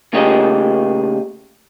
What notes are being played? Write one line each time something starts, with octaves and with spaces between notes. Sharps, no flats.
A#2 C#3 A3 G4 G#4 D#5